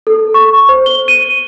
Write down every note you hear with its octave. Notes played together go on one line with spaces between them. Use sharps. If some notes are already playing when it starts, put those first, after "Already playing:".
A4
C#6
C5
G7
D#7